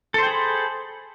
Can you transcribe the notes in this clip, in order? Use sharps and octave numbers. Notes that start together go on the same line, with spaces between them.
G#4 A4 C5 G5 B5